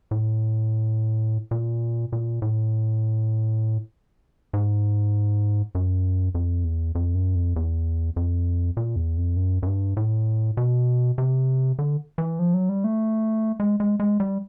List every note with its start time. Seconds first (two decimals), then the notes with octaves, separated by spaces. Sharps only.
0.11 A2
1.51 A#2
2.12 A#2
2.42 A2
4.53 G#2
5.75 F#2
6.35 F2
6.64 E2
6.95 F2
7.15 F#2
7.36 F2
7.56 E2
8.16 F2
8.77 A#2
8.96 E2
9.17 F2
9.37 F#2
9.63 F#2
9.67 G2
9.97 A2
10.57 B2
11.18 C3
11.79 D3
12.18 E3
12.39 F3
12.54 F#3
12.69 G3
12.84 A3
13.60 G#3
13.80 G#3
14.00 G#3
14.20 G3